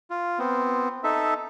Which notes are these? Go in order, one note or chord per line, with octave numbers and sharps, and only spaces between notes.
F4
B3 C4
D#4 A4 E5